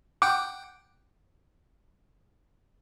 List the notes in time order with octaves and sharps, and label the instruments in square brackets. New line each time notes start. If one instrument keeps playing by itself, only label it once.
[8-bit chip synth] F#5 G5 [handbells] D6